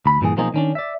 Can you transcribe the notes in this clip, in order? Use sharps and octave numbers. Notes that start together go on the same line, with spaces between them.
D2 B5
G2 A#2 E3 G#4
B1 F3 A#3 C4 D#4 G#4
D#3 C#4 D4
D5 E5